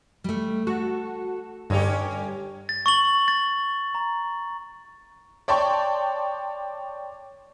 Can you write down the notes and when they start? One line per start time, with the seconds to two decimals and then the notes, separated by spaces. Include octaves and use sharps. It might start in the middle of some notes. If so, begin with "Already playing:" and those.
0.24 G3 A3
0.67 F#4 A4
1.70 G2 D3 C#4 G4
2.69 A6
2.86 C#6 A6 F#7
3.28 A6
3.95 A#5
5.48 C#5 D5 G5 A5 C6 C#6